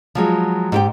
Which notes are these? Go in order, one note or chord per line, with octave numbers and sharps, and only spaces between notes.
F3 F#3 G#3
G#2 G4 G5